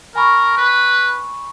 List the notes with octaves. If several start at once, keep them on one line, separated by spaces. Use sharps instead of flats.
A#4 G#5 B5 C#6
B4